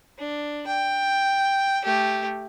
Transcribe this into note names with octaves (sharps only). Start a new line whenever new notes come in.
D4
G5
A3 G4